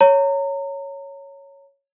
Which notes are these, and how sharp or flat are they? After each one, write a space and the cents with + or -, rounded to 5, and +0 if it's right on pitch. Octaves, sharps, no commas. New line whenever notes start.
C#5 +0 A#5 -30